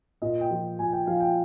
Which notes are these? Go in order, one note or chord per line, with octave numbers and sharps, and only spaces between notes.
A#2 D#5
G5
F3
A#2 G#5
G5
F3 F5
G5